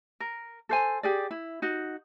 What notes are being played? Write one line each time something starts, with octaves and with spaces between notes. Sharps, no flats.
A#4
A4 C5 G#5
G4 G#4 D5
E4
D#4 F#4